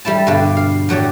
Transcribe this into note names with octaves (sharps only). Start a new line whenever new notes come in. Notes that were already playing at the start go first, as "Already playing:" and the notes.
G3 A3 E4 A5
G2 B2 D3 D4 G4 D5
F5
A2 F#3 G4 D5